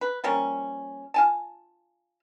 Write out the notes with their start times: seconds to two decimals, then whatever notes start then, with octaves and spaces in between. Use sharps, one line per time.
0.01 B4
0.24 F3 G3 A#3 C#4
1.14 F4 G#5 A5